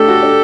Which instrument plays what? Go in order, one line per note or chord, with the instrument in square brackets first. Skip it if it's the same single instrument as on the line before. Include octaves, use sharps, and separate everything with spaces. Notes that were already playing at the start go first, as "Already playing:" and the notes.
Already playing: [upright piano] A3 D4 [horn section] G4 A4
[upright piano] F#4
D4